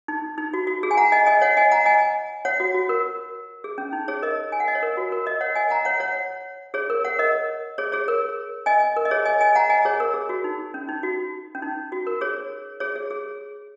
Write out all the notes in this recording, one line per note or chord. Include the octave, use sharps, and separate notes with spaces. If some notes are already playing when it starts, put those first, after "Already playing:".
D#4
D#4
F#4
F#4
G#4
G#5
F#5 A#5
D#5 G#5
D#5 G#5
C#5 F#5
D#5 G#5
F#5 A#5
D#5 G#5
C#5 F#5
F#4
F#4
A#4
G#4
C#4
D#4
G#4 C#5
A#4 D#5
G#5
F#5
D#5
C#5
A#4
F#4
A#4
A#4 D#5
C#5 F#5
D#5 G#5
F#5 A#5
C#5 F#5
C#5 F#5
G#4 C#5
A#4
C#5 F#5
A#4 D#5
G#4 C#5
G#4 C#5
A#4
D#5 G#5
A#4
D#5
G#4 C#5
D#5 G#5
D#5 G#5
F#5 A#5
D#5 G#5
G#4 C#5
A#4
G#4
F#4
D#4
C#4
D#4
F#4
C#4
D#4
F#4
A#4
G#4 C#5
G#4 C#5
G#4
G#4